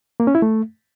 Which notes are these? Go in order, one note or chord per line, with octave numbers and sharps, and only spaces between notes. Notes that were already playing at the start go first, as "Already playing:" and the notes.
A#3
C#4
E4
A3